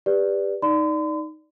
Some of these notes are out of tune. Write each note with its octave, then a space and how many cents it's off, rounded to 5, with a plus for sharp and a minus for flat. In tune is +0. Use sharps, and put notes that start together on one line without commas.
G4 +20 B4 +0 D5 -5
D#4 +0 D5 +0 C6 -45